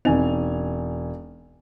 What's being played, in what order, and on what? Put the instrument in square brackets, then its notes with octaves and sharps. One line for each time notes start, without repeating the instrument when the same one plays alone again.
[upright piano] E1 G#5 F7 [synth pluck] C4 D#4